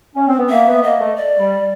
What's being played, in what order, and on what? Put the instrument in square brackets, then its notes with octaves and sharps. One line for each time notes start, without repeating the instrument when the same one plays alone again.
[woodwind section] C#4
C4
B3
[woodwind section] A#3 [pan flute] E5
[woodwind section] B3
[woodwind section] A#3 [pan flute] D#5
[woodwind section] A3
[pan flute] D5
[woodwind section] G3